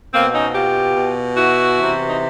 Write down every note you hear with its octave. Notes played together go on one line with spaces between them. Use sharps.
B2 A#3 C4
C#4 D#4
F4 G4
B2
E4 F#4
C3 E3
D#4